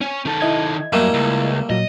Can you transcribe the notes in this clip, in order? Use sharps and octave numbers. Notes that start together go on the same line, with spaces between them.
C#4
D#3 A4
E4 D#5 G#6
F#2 G3 A3 A#3
C#2
A#2 F#3 D#5